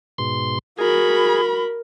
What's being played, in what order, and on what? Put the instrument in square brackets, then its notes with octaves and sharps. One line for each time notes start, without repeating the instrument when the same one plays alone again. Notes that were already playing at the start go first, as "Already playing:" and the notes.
[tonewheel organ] G#2 B2 C6
[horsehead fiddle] F#4 B5 [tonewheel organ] G#4 [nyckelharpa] A#4